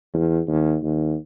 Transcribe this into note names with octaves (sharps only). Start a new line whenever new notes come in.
E2
D#2
D#2